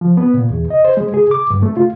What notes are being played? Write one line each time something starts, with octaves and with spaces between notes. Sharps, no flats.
F3
B3
A#2
E2
D#5
C5
G#3
G#4
D6
G2
A3
F4